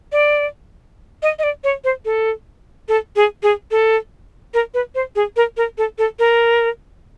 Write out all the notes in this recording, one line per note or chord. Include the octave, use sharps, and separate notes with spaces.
D5
D#5
D#5
D5
C#5
C5
A4
A4
G#4
G#4
A4
A#4
B4
C5
G#4
A#4
A#4
A4
A4
A#4